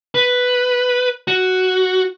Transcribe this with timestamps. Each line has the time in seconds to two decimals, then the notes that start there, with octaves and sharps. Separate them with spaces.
0.15 B4
1.28 F#4